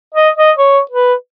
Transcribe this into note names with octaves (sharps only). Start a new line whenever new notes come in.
D#5
D#5
C#5
B4